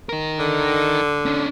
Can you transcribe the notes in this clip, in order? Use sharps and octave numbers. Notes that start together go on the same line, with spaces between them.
D#4 A#4
D3
C#4 D4